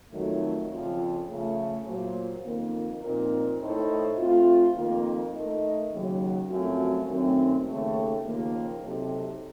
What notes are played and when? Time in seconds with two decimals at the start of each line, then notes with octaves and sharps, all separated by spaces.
0.11 F2 D#3 F#3 A3
0.70 F2 C#3 F3
1.28 C#3 F3 A3
1.85 A#2 F#3 A#3 F4 C5
2.43 F2 D#3 A#3
3.01 A#2 F3 C4 D#4 A#4
3.60 A2 A3 D#4 A4 C5
4.17 A3 C4 F4
4.75 F2 D#3 A#3 F4 A#4
5.34 A3 D#4 A#4 D#5
5.92 D#2 C#3 F#3
6.49 F#2 F3 A3 C4 F#4
7.07 F#2 D#3 A3 C4
7.65 D#2 C#3 A3
8.23 D#2 C#3 F3 A#3
8.81 C3 F#3 C4 D#4 A4